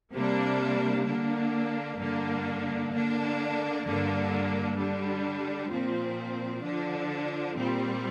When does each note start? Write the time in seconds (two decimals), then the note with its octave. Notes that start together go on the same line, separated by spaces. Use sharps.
0.13 C3 G3 A#3 D4
1.06 D3 A#3 D4
1.99 G2 D3 A#3 D4
2.92 D3 A#3 D4
3.85 G2 D3 A#3 D4
4.78 D3 G3 D4
5.71 A#2 F3 C4
6.64 D3 F3 D4
7.56 A#2 G3 C4